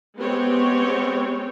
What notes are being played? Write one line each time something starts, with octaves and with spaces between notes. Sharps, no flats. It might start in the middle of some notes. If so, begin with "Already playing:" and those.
G#3 B3 C4 G4 C#5